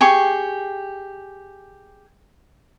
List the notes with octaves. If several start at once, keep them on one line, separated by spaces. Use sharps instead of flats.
G4 G#4 C#6